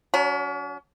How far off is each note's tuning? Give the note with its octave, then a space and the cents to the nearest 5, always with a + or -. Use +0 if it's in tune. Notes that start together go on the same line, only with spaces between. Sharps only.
F#3 +0 C#4 +45